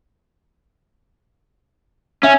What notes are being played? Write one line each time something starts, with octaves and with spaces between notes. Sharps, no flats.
C#4 E5 G#5